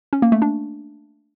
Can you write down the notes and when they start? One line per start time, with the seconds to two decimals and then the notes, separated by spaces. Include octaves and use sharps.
0.13 C#4
0.22 A#3
0.32 A3
0.42 D4